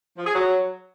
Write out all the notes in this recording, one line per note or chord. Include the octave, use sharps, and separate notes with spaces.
F3
G#4
F#3